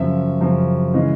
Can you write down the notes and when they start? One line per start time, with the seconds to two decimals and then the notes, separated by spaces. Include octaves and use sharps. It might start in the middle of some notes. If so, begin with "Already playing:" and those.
Already playing: F#2 C#3 F3 E5
0.41 F#2 C#3 F3
0.94 C#3 E3 G#3 C#4